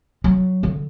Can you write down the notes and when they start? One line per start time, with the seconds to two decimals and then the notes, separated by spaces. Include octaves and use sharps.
0.24 F#3
0.63 D3